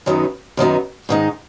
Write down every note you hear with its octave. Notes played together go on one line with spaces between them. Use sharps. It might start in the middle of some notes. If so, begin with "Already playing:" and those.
F#2 D#3 F#3 B3 D#4
F#2 D#3 F#3 B3 D#4
G#2 D#3 G#3 D#4